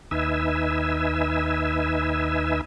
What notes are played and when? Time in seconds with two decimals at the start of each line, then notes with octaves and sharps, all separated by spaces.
0.11 D#2 D#4 B4 E5 G#5 E6